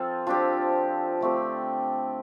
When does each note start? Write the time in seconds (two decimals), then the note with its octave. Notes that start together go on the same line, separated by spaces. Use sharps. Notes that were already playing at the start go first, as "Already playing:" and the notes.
Already playing: F3 C4 F4 A4
0.27 F3 D4 G4
1.21 D3 A3 C4 G4